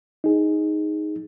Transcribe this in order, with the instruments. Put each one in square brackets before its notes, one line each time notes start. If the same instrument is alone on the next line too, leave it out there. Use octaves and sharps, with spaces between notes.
[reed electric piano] D#4 G#4